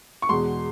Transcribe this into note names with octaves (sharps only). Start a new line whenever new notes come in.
C#6
E2 B2 G#3 C6